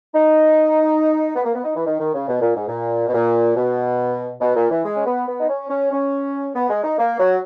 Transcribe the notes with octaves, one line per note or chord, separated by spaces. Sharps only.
D#4
B3
A#3
B3
D#4
E3
D#3
D#3
C#3
B2
A#2
G#2
A#2
B2
A#2
B2
B2
A#2
E3
G#3
C#4
B3
B3
D#4
C#4
C#4
C#4
B3
G#3
D#4
A#3
F#3